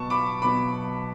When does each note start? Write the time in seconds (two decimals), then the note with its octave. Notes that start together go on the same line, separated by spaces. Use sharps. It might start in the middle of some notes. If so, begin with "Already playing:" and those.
Already playing: B2 F#3 B3 A5 C#6
0.10 B5 D6
0.42 B2 F#3 B3 B5 D6